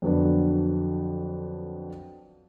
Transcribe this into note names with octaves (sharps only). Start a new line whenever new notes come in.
F2 D3 F#3 B3 D4